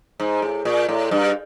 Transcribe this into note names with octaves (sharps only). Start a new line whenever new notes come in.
G#2
A2
A#2
A2
G2